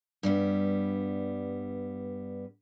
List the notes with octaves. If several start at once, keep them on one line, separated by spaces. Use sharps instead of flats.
G2 G3 B3